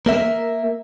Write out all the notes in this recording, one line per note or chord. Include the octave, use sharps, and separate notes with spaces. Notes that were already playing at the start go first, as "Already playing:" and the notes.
A#3 A#4 E5